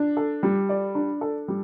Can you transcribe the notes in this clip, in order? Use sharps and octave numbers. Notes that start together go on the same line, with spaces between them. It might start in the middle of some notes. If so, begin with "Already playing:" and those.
Already playing: D4
A4
G3
D5
D4
A4
G3